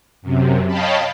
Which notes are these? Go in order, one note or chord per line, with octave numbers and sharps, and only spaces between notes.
F#2 C3
C#5 D#5 F5 G5 A5 B5